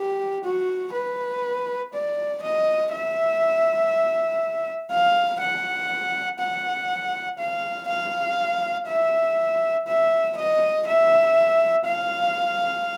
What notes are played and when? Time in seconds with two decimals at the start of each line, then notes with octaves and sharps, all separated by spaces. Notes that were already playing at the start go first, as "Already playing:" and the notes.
Already playing: G4
0.44 F#4
0.93 B4
1.93 D5
2.42 D#5
2.92 E5
4.91 F5
5.40 F#5
6.40 F#5
7.39 F5
7.88 F5
8.88 E5
9.87 E5
10.37 D#5
10.86 E5
11.85 F5